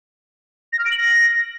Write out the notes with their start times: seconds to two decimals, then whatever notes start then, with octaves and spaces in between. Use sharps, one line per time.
0.73 A#6
0.79 F6
0.85 D7
0.91 F#7
0.97 A#6